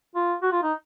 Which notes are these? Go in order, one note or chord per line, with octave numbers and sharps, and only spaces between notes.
F4
F#4
F4
D#4